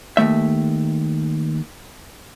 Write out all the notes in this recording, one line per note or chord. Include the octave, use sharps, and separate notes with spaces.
D#2 C#3 A3 E5